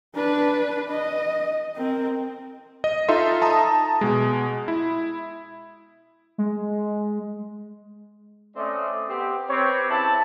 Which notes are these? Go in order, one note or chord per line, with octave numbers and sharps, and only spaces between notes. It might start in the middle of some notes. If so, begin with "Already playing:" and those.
D4 B4
D#5
C4 A#4
D#5
D#4 F4 A4 E5 C6
A5 A#5 D#6
B2 G#3
E4
G#3
A3 C4 C#4 D5 D#5
B3 C4 G4
C4 G4 B4 C#5
C#3 E4 A5